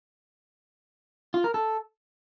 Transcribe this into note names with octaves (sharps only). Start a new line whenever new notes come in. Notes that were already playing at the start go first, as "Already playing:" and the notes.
F4
A#4
A4